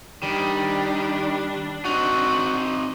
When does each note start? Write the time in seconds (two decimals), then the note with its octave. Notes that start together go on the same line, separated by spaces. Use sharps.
0.23 D#3 G3 D4
1.85 C4 D#4 F#4